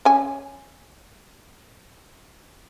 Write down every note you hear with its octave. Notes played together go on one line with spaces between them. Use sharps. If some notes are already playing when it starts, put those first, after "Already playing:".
C#4 G#5